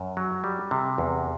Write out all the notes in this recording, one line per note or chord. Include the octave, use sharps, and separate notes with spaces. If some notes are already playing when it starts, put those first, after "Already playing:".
Already playing: F#2
F#3
G3
C3
E2